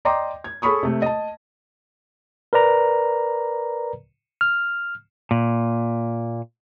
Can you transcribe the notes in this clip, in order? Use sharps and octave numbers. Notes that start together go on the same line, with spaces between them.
D5 D#5 G5 A#5 C6 D6
G#6
G#4 A4 C#5 B5 C#6 D#6
C3 A3
D#5 A5
A#4 B4 D5 A#5
F6
A#2